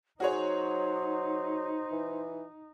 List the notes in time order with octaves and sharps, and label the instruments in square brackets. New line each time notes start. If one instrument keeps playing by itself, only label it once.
[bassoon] F#3 [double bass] D#4 [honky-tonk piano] F#4 G#4 C#5 [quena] C5
[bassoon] E3